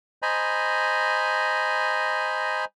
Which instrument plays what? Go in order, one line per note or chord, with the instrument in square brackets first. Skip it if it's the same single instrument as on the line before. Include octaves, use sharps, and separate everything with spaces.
[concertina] C5 D#5 G#5 A#5 B5